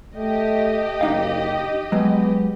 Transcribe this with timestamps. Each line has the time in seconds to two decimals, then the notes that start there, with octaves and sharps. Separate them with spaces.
0.16 A3 G4 D#5
1.01 F#1 D4 D#4 F5
1.92 F#3 G#3 B3